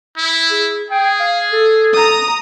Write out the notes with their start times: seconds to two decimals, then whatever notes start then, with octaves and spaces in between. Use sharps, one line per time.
0.17 E4
0.51 G#4
0.90 G#4 G5
1.20 F5
1.53 A4
1.93 A#5 D#6